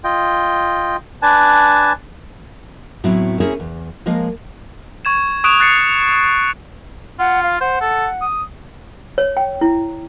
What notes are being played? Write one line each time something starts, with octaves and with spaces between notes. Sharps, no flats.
F4 D#5 G5
D4 B4 G#5 A5
A2 F#3 B3 C4 E4
C#4 E4 G#4 A#4 C5 C#5
E2
F3 G#3 A#3 A#4 D#5 F5
C#6 G#6 E7
C#6 D#6 F#6 D7 E7 F7
F#6 A6 C7 C#7
D#6
F4 F#5
F5
C5 F#5
A4
D#6
C#5
G5
E4